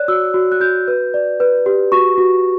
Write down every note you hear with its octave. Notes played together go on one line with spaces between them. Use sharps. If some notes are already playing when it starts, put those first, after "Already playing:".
Already playing: C#5 D5 F#6
F#4 E6
F#4
F#6
F#4 G6
B4
D5
B4
G4
F#4 C#6
F#4